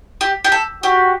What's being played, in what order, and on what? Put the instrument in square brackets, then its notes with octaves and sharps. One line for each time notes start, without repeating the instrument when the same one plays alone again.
[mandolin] G4
G4
A4
[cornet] F#4 [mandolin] G4